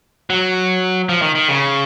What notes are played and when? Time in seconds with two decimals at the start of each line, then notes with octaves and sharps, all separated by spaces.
0.30 F#3
1.09 F3
1.22 D#3
1.35 D#3
1.49 C#3